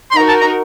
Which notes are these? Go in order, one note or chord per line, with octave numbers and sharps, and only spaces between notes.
C6
D#4 F#4 A#4 A#5
A5
A#5